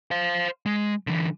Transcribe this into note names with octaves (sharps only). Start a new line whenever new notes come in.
C5 F5
G#3
D3 E3